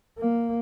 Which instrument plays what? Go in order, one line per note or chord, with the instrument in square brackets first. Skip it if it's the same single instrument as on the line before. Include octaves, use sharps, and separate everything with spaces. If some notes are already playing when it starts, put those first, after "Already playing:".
[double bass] A#3